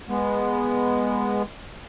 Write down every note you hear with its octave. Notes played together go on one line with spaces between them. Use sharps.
G#3 B3